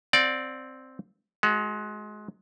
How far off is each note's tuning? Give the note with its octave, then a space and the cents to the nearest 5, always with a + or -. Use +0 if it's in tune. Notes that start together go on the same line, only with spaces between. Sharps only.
C4 +0 D5 +0 F#5 -40
G#3 +25 F#4 +0